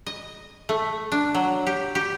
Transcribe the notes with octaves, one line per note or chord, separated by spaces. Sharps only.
D#5
A3
D4
F#3
G4
G4